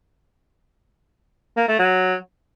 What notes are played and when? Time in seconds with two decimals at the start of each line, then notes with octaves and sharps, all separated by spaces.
1.57 A#3
1.68 A3
1.79 F#3